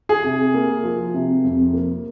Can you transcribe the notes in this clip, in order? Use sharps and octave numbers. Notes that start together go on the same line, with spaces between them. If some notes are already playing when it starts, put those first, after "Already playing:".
G#4
C3
A#3
F3
C3
F2
A#3